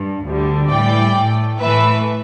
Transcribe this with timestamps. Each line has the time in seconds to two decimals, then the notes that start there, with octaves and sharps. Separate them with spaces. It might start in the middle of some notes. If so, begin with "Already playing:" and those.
Already playing: G2
0.26 D2 D3 G3
0.70 A2 E3 G3 D5 G5
1.15 A2 A3
1.60 A2 E3 A3 B4 E5